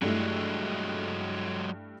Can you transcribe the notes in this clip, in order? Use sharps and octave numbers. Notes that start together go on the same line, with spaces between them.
G2 F#3 G#3 A3 E4